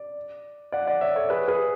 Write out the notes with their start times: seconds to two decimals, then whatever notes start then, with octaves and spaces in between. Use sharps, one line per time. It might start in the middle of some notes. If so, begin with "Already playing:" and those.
Already playing: D5
0.72 D5 F#5
0.87 D5 F#5
1.01 C#5 E5
1.16 A4 C#5
1.30 G#4 B4
1.48 G#4 B4